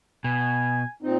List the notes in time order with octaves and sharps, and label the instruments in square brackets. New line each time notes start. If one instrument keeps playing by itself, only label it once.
[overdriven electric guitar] B2 [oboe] G#5
[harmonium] A#2 C4 D#4